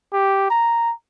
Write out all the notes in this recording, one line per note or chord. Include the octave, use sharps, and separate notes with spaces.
G4
A#5